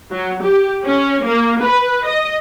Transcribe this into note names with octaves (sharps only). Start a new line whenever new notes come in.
F#3
G4
C#4
A#3
B4
D#5